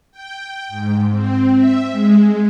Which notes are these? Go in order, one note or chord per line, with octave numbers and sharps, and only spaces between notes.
G5
G#2
C4
E5
G#3